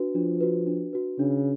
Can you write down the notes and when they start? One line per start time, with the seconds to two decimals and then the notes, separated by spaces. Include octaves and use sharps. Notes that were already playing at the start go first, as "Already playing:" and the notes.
Already playing: D4 F#4 B4
0.15 F3 D4
0.41 F#4 B4
0.67 D4
0.93 F#4 B4
1.19 C#3 D4